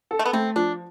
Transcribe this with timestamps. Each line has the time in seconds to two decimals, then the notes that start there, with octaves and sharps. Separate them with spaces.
0.11 A4
0.19 A3
0.26 B3
0.33 A3 C4
0.56 F3 D4